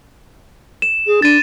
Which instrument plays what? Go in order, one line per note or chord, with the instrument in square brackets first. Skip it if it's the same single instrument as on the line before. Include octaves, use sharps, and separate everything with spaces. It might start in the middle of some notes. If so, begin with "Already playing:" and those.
[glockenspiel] E7
[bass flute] G#4
[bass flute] D4 [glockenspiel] A6 D#7